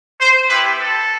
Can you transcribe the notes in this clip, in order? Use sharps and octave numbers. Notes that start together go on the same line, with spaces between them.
C5
B3 E4 G4 B4
A4